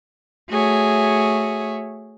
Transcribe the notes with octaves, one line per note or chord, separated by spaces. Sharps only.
A3 F#4 G#4 C#5 E5